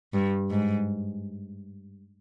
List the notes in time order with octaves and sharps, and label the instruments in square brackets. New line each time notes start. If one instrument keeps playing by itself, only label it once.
[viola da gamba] G2
G#2